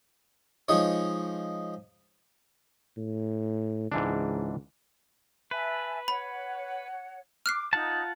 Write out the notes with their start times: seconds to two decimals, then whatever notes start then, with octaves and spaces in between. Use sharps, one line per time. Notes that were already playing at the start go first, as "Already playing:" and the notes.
0.68 F3 G#3 D#4 C#5
2.97 A2
3.92 C#2 G#2 E3 D4
5.51 B4 E5 G#5 A5
6.08 C#5 F#5 B5
7.46 D6 F6 F#6 C7
7.73 D#4 F4 F#5 A5